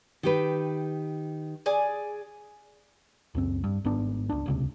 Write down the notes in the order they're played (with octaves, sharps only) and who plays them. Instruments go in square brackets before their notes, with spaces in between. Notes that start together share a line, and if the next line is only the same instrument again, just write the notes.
[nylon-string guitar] D#3 G4 B4
[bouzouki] G#4 D5 G#5
[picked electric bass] C#2 F#2 C4
G2
G#1 G#2 B3 D4
C#2 D4
D#1 C#2 C3